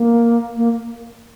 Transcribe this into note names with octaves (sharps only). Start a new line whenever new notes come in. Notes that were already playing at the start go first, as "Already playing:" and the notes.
Already playing: A#3
A#3